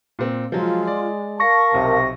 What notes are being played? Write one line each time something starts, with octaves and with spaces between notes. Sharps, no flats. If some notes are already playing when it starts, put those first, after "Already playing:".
A#2 C4
F3 F#3 G#3 F4
D5
A#4 F5 A5 C#6 A#6
B1 C3